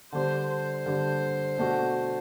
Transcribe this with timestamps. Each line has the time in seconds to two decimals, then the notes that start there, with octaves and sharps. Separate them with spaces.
0.12 D3 G3 D4 C5
0.49 C5
0.86 D3 G3 D4
1.58 B2 A3 D4 F#4